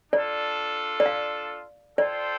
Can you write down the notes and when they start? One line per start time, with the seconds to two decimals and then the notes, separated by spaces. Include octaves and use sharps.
0.12 D4 F4 A4 D5
1.00 D5
1.06 F5
1.98 F4 A4 C5 D5 G5